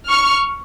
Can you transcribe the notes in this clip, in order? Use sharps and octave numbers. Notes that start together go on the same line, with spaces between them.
C#6 F6